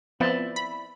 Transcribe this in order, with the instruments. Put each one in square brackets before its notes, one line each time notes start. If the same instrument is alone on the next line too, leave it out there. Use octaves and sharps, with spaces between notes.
[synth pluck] F3 B3 C4 [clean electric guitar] E4 D5 E5
[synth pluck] B5